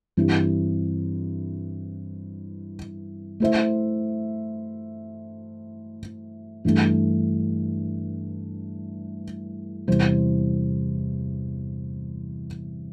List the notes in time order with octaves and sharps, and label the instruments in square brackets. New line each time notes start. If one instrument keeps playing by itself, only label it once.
[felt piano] G2 E3 C4 E4 G4
A3 E4 C5 E5
G2 E3 A3
E2 C3 G3 E4 C5